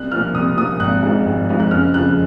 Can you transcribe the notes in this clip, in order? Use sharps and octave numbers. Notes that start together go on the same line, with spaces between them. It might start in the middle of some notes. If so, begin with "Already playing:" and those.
Already playing: C2 F#6
A#2 F3 F6
C2 D#6
A#2 F3 D#6
G#1 F#6
G#2 F3
G#1
G#2 F3
F#6
F#1 F6
F2 C#3 F3 F#6